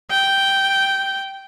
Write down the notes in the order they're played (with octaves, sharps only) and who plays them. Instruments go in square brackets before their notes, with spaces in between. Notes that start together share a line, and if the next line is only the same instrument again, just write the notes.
[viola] G5